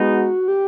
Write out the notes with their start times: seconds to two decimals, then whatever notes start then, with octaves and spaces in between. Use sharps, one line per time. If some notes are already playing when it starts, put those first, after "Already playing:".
Already playing: G#3 B3 D#4 F#4
0.48 G4